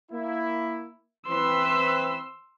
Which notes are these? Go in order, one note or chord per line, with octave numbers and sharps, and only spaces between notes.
A#3 E4
E3 C4 B4 C6 E6